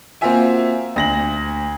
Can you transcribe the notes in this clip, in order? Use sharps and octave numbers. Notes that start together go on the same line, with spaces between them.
A#3 C4 F4 F#4 E5 G#5
D2 A#6 F#7